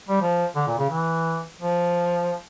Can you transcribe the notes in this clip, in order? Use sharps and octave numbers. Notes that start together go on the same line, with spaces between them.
G3
F3
D3
A#2
C#3
E3
F3